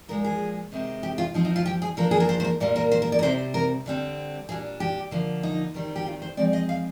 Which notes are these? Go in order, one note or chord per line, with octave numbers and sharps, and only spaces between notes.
A#2 F3 G#3 A#4
G#4
C3 D#3 G#3 C4
G4
F4
F3 C4 D#4
D#4
F4
G4
G#4
F3 A#3 D4 A#4
G#4
A#4
C5
C5
A#4
A#2 G3 A#3 D5
A#4
C5
A#4
D5
A#4
C3 G3 C4 C5
A#4
D3 G3 C4
A#2 G3 D4 G#4
G4
D3 F3 A#3
D#4
D#3 G3 C4
G4
F4
C5
F3 G#3 C4 D5
D#5
F5